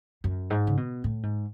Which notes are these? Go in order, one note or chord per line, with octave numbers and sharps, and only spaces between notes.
F#2
G#2
C#3
B2
A2
G#2